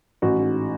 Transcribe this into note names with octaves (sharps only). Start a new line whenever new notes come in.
A1 F#4
G#2